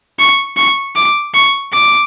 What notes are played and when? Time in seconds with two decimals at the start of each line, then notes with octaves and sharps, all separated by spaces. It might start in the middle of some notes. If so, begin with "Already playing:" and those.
0.19 C#6
0.57 C#6
0.96 D6
1.34 C#6
1.74 D6